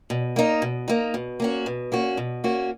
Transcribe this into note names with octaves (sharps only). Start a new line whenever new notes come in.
B2
A#3 D#4
B2
A#3 D#4
B2
A#3 C#4 F#4
B2
A#3 C#4 F#4
B2
A#3 C#4 F#4